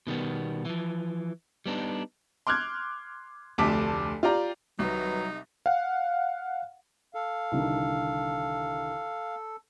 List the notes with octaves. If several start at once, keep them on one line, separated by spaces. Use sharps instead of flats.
B2 D#3 G3 B3
E3 F3
G3 B3 D4 D#4
C6 D6 F6 F#6 G#6
F1 D2 A5 D6 B6
F4 G4 D5 A#5
C2 D#3 F#3 D#4 B4
F5 F#5
A4 F5
C2 D3 D#3